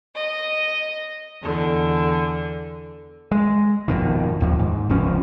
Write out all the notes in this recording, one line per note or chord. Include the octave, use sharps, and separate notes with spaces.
D#5
E2 D3
G#3
G#1 F2 B2 D#3
D#1 D#2 F3
G#2
F1 C#2 F3 C#4